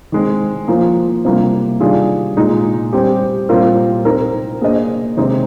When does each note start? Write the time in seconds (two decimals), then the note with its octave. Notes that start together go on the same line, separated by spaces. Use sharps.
0.12 D#3 G#3 C4
0.68 F3 A#3 F4 C5
1.25 C3 G3 A#3 F4
1.80 D#3 G3 D4 F4 G#4
2.37 A#2 G#3 D#4
2.93 G3 C4 G4
3.49 A#2 G3 C4 F4 A#4
4.05 C4 D#4 A#4
4.62 A#3 D4 G#4 C5 D#5
5.17 C3 D#3 G#3 C4 D#4